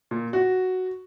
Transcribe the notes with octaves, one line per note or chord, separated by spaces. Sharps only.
A#2
F#4